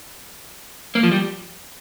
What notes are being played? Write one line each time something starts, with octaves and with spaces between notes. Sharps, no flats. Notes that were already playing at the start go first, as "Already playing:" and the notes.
A#3
F3
G3